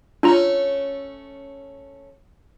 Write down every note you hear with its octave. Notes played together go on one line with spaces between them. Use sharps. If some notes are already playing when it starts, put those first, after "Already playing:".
A3 C#4 D4 F4 A#5